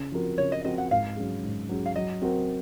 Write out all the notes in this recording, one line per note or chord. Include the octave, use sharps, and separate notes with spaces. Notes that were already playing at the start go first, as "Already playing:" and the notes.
Already playing: C#3
F3 C4 F#4 A#4
C#3 C#5
D#5
F3 C4 F#4 A#4 D#5
F#5
G#2 F5
F#3 C#4 G#4
G#2
F#3 C#4 G#4
F5
F#3 D#5
C4 F#4 A#4